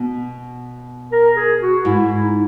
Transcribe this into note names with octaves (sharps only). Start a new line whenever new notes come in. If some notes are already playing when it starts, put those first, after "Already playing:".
Already playing: B2
A#4
G#4
F#4
G#2 E4
D#4